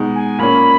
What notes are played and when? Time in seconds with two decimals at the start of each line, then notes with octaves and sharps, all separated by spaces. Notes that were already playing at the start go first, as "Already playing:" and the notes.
Already playing: B2 G#3 D#4
0.15 G#5
0.39 A#2 A#3 C#4 B5